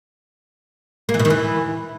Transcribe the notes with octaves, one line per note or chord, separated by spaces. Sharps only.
A#3
E3
B2
D#3
E3